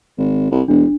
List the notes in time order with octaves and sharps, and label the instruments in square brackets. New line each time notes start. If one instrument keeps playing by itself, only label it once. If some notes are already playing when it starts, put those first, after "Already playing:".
[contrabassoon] G#1
C2
[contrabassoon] E1 [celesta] D4